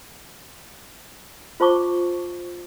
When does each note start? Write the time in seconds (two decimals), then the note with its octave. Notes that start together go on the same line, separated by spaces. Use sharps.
1.60 F4 C5 A5 C#6 D6